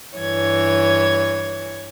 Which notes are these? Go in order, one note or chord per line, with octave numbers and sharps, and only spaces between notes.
G2 E3 C#5 G#6